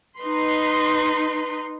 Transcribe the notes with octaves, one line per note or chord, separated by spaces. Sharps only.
D#4 B4 C6